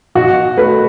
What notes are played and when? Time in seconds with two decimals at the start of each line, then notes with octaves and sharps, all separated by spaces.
0.15 B2 F#4
0.57 A3 B4